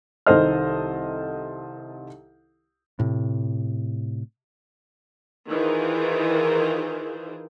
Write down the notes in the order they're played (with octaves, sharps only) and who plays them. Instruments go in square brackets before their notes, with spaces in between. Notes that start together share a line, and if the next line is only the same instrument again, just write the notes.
[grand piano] C2 D#3 A4 C5 D#5 F6
[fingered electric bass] A2 C3
[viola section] D#3 E3 F4 G#4 A#4 C5